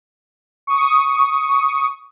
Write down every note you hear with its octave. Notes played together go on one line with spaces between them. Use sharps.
C#6 D#6